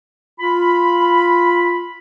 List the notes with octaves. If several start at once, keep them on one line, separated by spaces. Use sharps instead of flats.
F4 B5